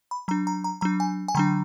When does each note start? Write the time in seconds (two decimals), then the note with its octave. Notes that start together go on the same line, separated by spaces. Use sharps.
0.11 B5
0.28 F#3 D4 A#5
0.47 A#5
0.64 A#5
0.81 F#3 D4 A#5
1.00 G#5
1.28 G#5
1.35 D3 F#3 D4 A#5